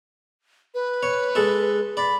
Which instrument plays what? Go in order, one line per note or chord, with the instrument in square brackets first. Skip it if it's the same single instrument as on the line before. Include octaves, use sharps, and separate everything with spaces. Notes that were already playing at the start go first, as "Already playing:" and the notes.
[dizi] B4
[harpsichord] C#5
G#3 A4
[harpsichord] D5 [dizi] B5